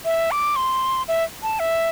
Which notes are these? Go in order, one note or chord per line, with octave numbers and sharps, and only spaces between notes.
E5
D6
C6
E5
A5
E5